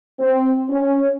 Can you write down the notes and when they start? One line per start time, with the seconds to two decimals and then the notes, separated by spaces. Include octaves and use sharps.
0.20 C4
0.70 C#4